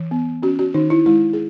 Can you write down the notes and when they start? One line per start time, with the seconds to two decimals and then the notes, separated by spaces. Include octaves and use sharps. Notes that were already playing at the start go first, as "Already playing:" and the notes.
Already playing: E3
0.11 B3
0.43 C#4 F#4
0.59 F#4
0.74 D#3 D#4
0.90 E4
1.06 G#3 E4
1.33 G#4